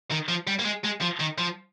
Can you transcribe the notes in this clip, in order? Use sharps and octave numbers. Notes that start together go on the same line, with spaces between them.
D#3
F3
G3
A#3
G#3
G#3
F3
D#3
F3